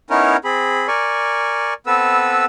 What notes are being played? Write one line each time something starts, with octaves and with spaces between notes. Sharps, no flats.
B3 C#4 D#4 E4 A#4 C#5
C4 G#4 B5
A#4 D5 G#5 C#6
B3 C4 A4 B4 E6